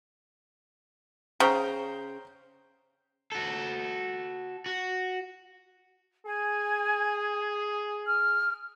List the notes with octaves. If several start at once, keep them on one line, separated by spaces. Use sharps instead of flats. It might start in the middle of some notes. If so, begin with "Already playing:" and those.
C#3 C5 G5 A#5
F#4 A4
F#4
G#4 G#5
F6